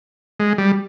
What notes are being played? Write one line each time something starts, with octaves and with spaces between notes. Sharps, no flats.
G#3
G3